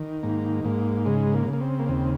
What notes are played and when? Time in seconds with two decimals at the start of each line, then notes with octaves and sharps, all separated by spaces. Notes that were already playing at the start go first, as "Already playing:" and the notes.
Already playing: D#3
0.23 G#2 A#3
0.65 G#2 A#3
1.05 C#3 G#3
1.34 A#3
1.47 C#3
1.53 A#3
1.60 C4
1.79 A#3
1.89 D#2 C4